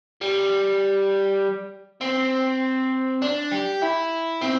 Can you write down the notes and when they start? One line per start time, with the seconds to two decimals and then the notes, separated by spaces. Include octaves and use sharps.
0.21 G3
2.01 C4
3.22 D4
3.52 G4
3.82 E4
4.41 C4